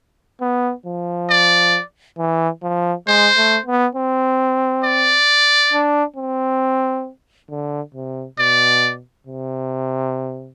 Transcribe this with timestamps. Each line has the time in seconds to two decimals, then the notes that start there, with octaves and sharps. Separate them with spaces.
0.41 B3
0.86 F3
1.30 D5
2.18 E3
2.63 F3
3.07 G#3 C5
3.37 A3
3.66 B3
3.95 C4
4.84 D5
5.73 D4
6.16 C4
7.50 D3
7.94 C3
8.39 B2 D5
9.27 C3